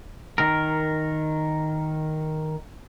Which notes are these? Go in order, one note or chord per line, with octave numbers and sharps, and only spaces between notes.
D#3 A#4